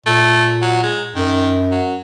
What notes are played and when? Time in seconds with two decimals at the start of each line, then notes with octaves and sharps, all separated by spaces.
0.06 A#2 A3
0.62 F#3
0.83 G#3
1.15 F#2 D#3
1.71 F#3